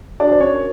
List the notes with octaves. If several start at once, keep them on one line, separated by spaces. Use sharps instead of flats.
D4 F#4 D5
C5
C#4 C#5
A#4